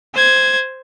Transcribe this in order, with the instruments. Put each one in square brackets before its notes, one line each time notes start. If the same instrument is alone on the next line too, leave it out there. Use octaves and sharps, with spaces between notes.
[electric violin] C5 G#6